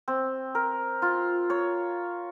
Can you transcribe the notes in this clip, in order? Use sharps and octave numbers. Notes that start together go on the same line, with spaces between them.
C4
A#4
F4
C#5